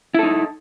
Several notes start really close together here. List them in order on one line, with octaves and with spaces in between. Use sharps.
E4 A4 D#4